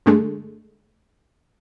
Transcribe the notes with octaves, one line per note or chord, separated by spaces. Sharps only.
G2 D3 G#3 A3